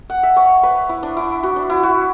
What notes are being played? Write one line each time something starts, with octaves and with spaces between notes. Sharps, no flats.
F#5
E5
C#5
B4
E4
D4
E4
F#4
D4
E4
F#4